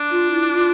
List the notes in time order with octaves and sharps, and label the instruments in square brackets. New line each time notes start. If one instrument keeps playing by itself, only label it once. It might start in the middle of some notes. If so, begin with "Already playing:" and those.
Already playing: [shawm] D4
[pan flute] F4
E4
F4